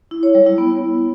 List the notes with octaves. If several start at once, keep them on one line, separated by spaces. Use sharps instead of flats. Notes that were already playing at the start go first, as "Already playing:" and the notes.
E4
C#5
G3
E4
B3